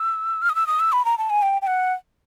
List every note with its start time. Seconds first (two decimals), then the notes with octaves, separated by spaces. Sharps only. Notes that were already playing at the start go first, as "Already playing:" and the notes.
Already playing: E6
0.42 F6
0.49 D#6
0.55 E6
0.67 D#6
0.80 E6
0.92 B5
1.05 A#5
1.18 A5
1.30 G#5
1.42 G5
1.62 G5
1.67 F#5